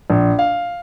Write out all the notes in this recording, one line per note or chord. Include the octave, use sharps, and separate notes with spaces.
A#1
F5